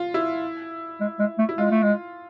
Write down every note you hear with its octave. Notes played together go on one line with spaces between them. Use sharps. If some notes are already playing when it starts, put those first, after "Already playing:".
Already playing: F4
E4
G#3
G#3
A3
E4
G#3 F4
A3
G#3